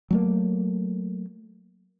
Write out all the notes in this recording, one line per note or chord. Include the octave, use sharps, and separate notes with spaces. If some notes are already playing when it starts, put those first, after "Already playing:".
F#3 A3 A#3